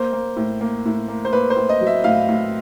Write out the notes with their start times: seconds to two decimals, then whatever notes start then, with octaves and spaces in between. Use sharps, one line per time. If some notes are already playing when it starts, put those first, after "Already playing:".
Already playing: A#3 C5
0.13 A#3
0.37 A2
0.61 A#3
0.86 A2
1.09 A#3
1.25 C5
1.33 A#3 B4
1.50 C5
1.56 A2
1.69 D#5
1.81 F#3
1.87 E5
2.04 A2 F5
2.29 A2